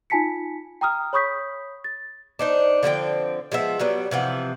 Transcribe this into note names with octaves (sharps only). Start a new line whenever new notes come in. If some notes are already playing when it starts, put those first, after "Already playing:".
D#4 F4 G#5 A5 B6 C#7
G5 A#5 D#6 F6
C#5 B5 C#6 D#6 G6 B6
A6
D4 D#4 C5
D3 F3 C4 G5
F3 G#3 B3 E5
F#3 G3 B3
C3 E3 F3 F#5